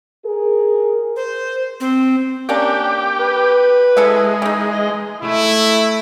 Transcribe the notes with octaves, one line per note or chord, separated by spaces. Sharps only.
G#4 A#4
C5
C4
A#3 C#4 D4 G4
B4
G#3 E4 A4 E5
E3 D#4
D#5
A3 E4